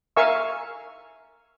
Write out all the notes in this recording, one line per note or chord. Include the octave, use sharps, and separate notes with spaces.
A#4 E5 F5 G#5 C#6 E6